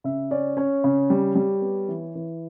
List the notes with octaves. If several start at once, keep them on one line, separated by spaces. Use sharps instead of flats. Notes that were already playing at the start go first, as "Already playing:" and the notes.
C#3 E5
C#4 D5
C#4 C#5
C#3
G3
G3
B3
E3
E3